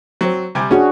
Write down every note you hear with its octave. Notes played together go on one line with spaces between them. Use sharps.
F#3 C4
C3 G3 G#5
C#4 D4 F#4 G#4